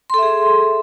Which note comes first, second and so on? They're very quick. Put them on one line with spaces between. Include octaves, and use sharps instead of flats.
C6 A4 E5 G#4